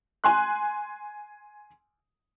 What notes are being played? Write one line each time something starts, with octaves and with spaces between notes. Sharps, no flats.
G#5 C6 F#6